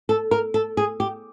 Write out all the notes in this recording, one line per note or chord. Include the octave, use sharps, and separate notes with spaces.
A4
A#4
A4
G#4
G4